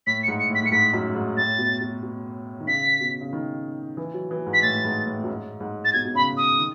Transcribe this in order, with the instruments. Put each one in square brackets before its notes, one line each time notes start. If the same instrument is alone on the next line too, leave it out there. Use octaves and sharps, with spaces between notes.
[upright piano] A2 [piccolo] B6
[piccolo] C#7
[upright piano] G#2
[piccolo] C#7
[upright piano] A2
[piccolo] B6
[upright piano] A2 [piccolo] C#7
[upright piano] G#2 [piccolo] B6
[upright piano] F#2
G#2
[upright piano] A2 [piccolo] A6
[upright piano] B2
B2
B2
D#3
[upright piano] C#3 [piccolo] B6
[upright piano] B2
C#3
D#3
E3
F#3
E3
G#2
[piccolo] B6
[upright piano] A2 [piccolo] A6
[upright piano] G#2
A2
F#2
G#2
G#2
[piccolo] A6
[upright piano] B2 [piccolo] G#6
[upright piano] B2
[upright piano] C#3 [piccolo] B5
[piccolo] D#6
[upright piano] D#3